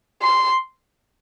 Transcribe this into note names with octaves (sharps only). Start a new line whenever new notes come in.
C6